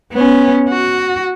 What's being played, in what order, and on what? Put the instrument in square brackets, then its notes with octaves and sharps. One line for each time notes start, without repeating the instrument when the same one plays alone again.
[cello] B3 C#4
F#4